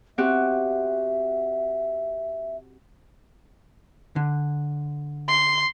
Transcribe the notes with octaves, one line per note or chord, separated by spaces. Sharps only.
C4 F#4 G4 E5
D3
C6